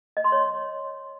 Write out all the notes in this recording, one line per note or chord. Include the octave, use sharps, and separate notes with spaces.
D#5
C6
C#5